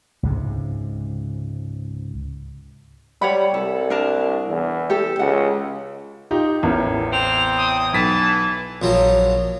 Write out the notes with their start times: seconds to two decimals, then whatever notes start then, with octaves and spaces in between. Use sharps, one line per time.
0.23 C#2 G#2 C3
3.22 G3 C#5 F#5 B5
3.54 C2 A4
3.90 D4 A#4 A5
4.49 E2
4.90 G4 A4
5.19 C#2 F#5
6.31 D#4 F4 G4
6.63 A1 E2 E4 A#4
7.12 C4 F7
7.57 D#6
7.93 B1 E3 A5 B6
8.82 A#1 F3 F#3